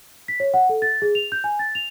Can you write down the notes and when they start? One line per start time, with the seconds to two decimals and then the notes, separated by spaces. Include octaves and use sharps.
0.28 B6
0.40 C#5
0.54 F#5
0.69 A4
0.82 A6
1.02 G#4
1.15 F7
1.32 G6
1.44 G#5
1.59 A6
1.75 F7